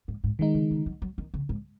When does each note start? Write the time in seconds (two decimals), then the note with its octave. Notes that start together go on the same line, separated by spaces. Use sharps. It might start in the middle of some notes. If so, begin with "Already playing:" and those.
0.08 G#2
0.24 G#2
0.39 B2 D#3 G#3 D#4
0.55 C#3
0.71 C#3
0.86 F#3
1.02 F#3
1.18 D#3
1.34 C#3
1.49 G#2